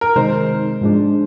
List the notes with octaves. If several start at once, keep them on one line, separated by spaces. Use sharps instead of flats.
A#4
C3 D#3 G#3 D#4 C5
G#2 F3 G#3 D4